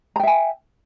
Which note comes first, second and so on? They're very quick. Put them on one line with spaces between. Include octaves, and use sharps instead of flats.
A#5 G5 E5 G#5